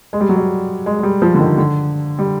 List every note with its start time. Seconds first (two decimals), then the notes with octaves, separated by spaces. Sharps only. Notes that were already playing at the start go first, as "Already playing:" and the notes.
0.13 G#3
0.21 G3
0.29 F#3
0.36 G3
0.86 G#3
0.99 G#3
1.03 G3
1.22 F3
1.34 D3
1.39 D#3
1.57 D3
2.19 G3